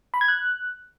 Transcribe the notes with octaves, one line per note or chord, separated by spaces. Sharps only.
B5
G#6
F#6